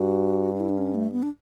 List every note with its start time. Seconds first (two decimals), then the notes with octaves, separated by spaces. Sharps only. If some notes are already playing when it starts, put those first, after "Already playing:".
Already playing: G2 F#4
0.53 D4
0.60 E4
0.69 D4
0.78 C#4
0.95 A3
1.12 B3
1.23 D4